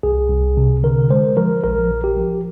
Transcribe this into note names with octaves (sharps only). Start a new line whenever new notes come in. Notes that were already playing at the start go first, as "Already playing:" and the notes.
C2 G#4
C2
C3
D3 A#4
G#3 C5
F3 A#4
A#1 A#4
F3
G4
F3